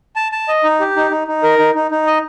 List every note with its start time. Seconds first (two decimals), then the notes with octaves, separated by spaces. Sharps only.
0.16 A5
0.32 A5
0.48 D#5
0.64 D#4
0.80 G4
0.96 D#4
1.11 D#4
1.28 D#4
1.43 A#4
1.59 D#4
1.75 D#4
1.91 D#4
2.07 D#5